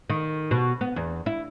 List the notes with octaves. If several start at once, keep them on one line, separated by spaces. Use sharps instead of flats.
D#3
B2
B3
E2
E4